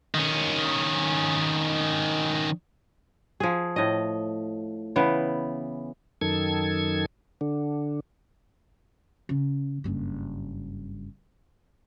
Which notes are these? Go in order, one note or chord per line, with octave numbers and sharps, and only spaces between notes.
D#3 C#4
F3 G#4
A2 D#5
C#3 E3 B3
F#2 D#3 A4 G#6
D3
C#3
F#1 G2